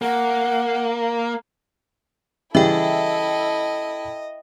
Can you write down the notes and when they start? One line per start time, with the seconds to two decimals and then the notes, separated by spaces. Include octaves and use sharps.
0.02 A#3 F#5
2.55 C#3 E3 G3 E4 A4 D#5 E5 G5